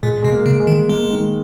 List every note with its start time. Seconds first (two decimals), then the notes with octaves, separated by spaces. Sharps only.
0.03 A#2 G#3
0.22 B2 G#3
0.32 A#3
0.46 C#3
0.60 G#3
0.67 D#3
0.89 G#3 A#3
1.10 D#3